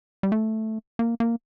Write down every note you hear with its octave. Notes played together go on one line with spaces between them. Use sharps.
G3
A3
A#3
A#3